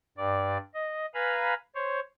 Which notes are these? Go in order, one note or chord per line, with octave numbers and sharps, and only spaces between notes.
G2 D5
D#5
B4 F5 G#5 A#5 B5
C5 C#5